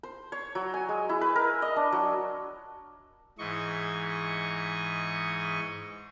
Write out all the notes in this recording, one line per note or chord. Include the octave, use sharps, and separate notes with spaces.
C5
C#5
F#3
G#5
G#3
E4
B4
A#4
D#5
D4
F#3
G#2 E3 D#5 C#6